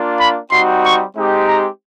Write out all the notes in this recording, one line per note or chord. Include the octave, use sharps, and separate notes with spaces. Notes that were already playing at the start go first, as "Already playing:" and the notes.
Already playing: A#3 D4 F4
B5
G3 C4 D#4 F#4 C6
C#6
G#3 C4 D#4 G4
A#5